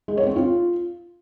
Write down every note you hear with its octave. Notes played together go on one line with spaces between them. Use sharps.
G#3
C#5
C4
F4